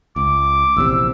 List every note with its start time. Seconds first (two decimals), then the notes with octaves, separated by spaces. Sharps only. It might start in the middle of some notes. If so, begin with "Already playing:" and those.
0.16 C#2 D6
0.77 A#1 E2 C3 E6